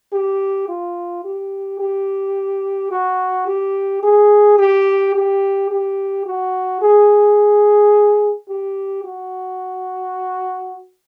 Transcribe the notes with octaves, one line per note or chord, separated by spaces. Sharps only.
G4
F4
G4
G4
F#4
G4
G#4
G4
G4
G4
F#4
G#4
G4
F#4